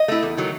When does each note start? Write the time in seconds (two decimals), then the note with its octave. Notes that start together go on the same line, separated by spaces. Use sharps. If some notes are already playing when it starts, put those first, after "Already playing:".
Already playing: D#5
0.08 A3 E4
0.23 E2
0.37 D#3 F#3 A3